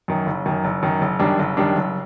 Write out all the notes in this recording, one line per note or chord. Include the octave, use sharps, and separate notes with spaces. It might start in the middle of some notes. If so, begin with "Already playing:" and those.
F#2 D#3
F#1
F#2 D#3
F#1
F#2 D#3
F#1
F#2 D#3 G3 D4
F#1
F#2 D#3 G3 D4
F#1